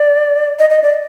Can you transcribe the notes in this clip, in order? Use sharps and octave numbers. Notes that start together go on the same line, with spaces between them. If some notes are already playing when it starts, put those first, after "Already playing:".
Already playing: D5
D#5
D#5
D5